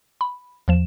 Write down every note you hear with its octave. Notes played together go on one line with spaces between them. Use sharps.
B5
E2 F3 E7